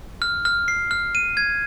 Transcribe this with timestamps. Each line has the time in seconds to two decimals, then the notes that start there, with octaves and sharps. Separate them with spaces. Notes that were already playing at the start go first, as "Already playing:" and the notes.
0.22 F6
0.45 F6
0.68 C7
0.91 F6
1.15 D#7
1.37 G#6